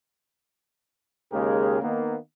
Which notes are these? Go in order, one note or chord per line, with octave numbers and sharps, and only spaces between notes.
D#2 C#3 G#3 G4 G#4 A#4
D#3 A#3 B3